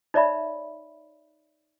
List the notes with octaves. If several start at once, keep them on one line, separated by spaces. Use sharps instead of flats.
D#4 C#5 D5 E5 B5